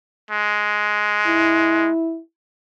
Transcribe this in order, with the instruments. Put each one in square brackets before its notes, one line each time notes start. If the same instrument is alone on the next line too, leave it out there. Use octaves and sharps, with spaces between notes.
[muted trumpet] G#3
[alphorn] E4